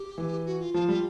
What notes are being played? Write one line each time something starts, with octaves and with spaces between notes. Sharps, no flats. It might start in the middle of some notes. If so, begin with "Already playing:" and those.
Already playing: G4
E3
F#4
F4
F3 F4
G3 F4